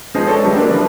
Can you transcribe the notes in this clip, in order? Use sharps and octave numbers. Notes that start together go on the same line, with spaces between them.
F3 G#3 B3 D#4 G#4 C5
A4 C#5 D5
C#3 F#3 G3 A3
A#3 D4
E3 F3 D4 B4